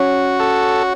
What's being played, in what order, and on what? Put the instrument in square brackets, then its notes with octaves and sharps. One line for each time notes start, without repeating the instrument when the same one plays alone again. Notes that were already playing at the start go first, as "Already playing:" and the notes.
Already playing: [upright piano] C#4 [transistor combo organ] F#4
[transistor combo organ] A4